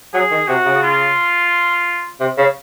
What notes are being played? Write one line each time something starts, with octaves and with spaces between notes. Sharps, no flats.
F#3 G#4
D#3
C3 F#4
C#3
F4
C3
C#3